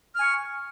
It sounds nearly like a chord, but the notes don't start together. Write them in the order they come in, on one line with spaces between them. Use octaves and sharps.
F6 G#5 C#6